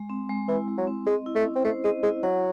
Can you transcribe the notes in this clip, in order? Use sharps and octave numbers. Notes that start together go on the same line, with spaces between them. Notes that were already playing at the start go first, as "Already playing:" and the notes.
Already playing: G#3
C4
G#3
E3 E4
G#3
F#3
C4
G#3 D#5
E4
A3
C#4
C4
A3 C5
G#3 D#5
G#3 E4
F#3 F#5